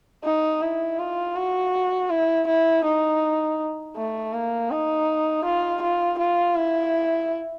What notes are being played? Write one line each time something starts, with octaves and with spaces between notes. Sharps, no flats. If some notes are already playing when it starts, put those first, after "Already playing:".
D#4
E4
F4
F#4
E4
E4
D#4
A3
A#3
D#4
F4
F4
F4
E4